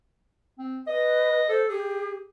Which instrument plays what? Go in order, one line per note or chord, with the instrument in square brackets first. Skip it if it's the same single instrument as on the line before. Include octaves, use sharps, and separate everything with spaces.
[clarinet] C4
[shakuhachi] B4 [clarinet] D#5
[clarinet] A4 [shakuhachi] C5
[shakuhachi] G4 [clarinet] G#4